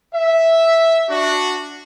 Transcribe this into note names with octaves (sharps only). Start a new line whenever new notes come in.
E5
D4 F#4